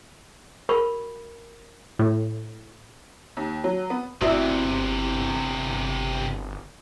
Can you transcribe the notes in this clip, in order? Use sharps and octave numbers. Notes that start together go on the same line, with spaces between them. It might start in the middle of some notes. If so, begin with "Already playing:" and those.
F#4 A#4 B5 C#6
A2
D#2
F#3
B3
G1 C3 E3 C4 E4 F#4 D5 E5